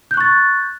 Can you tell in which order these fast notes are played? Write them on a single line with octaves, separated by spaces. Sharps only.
G6 F#6 C#6 A6